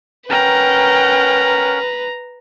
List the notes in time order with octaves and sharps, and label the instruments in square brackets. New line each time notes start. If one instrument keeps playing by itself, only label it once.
[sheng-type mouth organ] C#4 A#4 F#5 [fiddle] B4 [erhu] G5 [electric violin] A#5